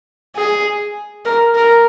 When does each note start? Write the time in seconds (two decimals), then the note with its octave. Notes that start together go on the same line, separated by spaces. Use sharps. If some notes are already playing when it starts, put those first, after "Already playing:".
0.36 G#4
1.25 A#4
1.55 A#4